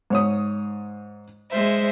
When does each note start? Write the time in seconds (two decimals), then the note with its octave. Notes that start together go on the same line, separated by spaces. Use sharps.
0.10 G#2 C#5 D#6
1.51 G#3 C5 E5